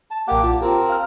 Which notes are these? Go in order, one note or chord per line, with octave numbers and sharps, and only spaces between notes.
A5
A#1 A#3 G4 F#5 D6
F4 A5
C4 G4 A#4
F5 F6